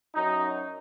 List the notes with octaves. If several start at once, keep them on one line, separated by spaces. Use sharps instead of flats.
F#2 F#3 D#4